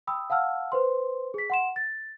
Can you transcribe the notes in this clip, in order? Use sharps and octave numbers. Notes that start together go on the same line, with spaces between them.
G5 B5 D#6 E6
F5 F#5 A5 E6 F6
B4 C5 C6
G#4 B6
F#5 C6 E7
A6